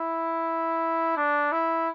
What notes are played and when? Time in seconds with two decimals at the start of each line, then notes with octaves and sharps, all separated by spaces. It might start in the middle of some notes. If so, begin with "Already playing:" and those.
Already playing: E4
1.17 D4
1.52 E4